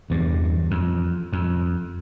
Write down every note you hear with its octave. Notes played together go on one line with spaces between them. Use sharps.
E2 G2
F2
F2